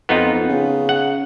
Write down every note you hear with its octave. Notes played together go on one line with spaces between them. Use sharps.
F2 B3 D#4 F4
F2
C#3
F#5